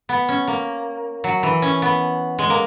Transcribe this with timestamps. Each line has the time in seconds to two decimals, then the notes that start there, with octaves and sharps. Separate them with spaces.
0.09 B3
0.29 C#4
0.48 A#3
1.24 F#3
1.43 E3
1.62 C#4
1.82 B3
2.39 G#3
2.50 A#3